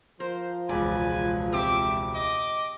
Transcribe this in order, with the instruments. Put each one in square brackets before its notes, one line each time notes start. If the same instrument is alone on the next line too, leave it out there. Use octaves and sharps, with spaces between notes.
[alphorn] F3 [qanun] A#4 [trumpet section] C5
[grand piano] E1 C#2 [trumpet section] B4 G#5 [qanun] D5
[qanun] C4 G4 [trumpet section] A4 E5 D6
[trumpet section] D#5 D6